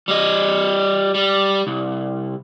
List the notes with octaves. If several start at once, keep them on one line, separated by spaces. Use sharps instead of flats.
G3 D#5
G3
C2